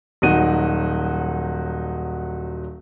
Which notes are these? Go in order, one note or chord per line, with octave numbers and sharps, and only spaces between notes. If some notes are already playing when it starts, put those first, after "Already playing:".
D#1 F#3 D#4 F#4 D#7